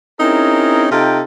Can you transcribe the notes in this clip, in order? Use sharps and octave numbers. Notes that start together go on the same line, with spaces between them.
C4 C#4 D#4 E4 G#4 A#4
C3 D#4 F4 A4 G5